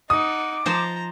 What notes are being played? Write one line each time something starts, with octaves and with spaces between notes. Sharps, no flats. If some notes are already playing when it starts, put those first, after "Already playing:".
D#4 F#5 D6 D#6
F3 C5 A5 A#5